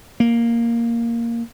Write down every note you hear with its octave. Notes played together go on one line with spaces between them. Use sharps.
A#3